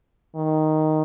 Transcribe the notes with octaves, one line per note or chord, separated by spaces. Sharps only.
D#3